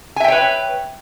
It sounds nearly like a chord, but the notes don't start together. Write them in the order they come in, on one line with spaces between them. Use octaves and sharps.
G#5 E5 G5 C#5 B4